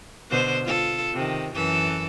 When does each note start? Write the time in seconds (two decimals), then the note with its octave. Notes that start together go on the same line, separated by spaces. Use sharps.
0.30 B2 D3 C5
0.64 F4 A4
1.13 C3 D#3
1.54 F#2 E3 A4